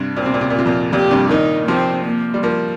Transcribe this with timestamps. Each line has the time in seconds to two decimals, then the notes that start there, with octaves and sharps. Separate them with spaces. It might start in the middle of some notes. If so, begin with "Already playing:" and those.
Already playing: G2 C3
0.17 A#2 C4
0.26 C3
0.34 A#2
0.41 C3
0.50 A#2
0.54 C3 F4
0.66 F2 A#2
0.92 F2 A#2 G4
1.11 G2 C3
1.29 A#2 D#3 D#4
1.68 C3 F3 C4
2.05 A#3
2.34 G3
2.43 F3 A#3